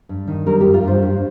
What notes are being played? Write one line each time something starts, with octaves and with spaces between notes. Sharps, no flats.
G2
D#3
G3 A#4
G2 G4
F4
G2 C5
G2